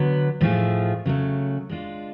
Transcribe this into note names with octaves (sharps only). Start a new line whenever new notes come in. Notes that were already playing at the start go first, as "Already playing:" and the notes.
Already playing: D3 F#3 B3
A2 F3 A3 F4 G#4
C#3 F#3 A3
G#3 D4 F4